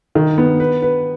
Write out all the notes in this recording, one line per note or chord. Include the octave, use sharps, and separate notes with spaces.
D#3
B3
B4
B4